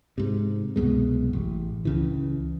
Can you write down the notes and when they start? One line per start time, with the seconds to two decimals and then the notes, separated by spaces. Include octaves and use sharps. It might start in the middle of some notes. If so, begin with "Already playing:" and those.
0.18 G#2 C3
0.76 C2 F#2 B2 G#3
1.33 A1
1.85 C#2 C#3 E3